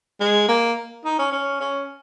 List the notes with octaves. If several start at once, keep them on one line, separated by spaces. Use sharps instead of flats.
G#3
A#3
D#4
C#4
C#4
C#4